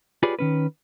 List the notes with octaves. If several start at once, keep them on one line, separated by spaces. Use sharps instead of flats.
F4 G4 G#4 B4 C#5 D5
D#3 C#4 B4